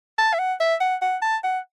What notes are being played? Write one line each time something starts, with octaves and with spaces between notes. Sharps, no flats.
A5
E5
F#5
E5
F#5
F#5
A5
F#5